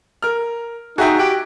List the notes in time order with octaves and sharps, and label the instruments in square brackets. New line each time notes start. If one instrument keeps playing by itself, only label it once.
[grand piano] A#4 F6
[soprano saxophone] D#4 [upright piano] F#4 E5 G5 [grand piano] G#4 G#5
[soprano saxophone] G4 [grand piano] F#6 D7